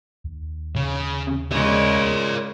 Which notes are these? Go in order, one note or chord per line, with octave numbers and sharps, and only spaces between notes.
D#2
C#3
C#3 G#3 A#4 D5